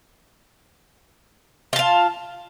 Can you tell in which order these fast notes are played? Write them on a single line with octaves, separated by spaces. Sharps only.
F4 A5 F5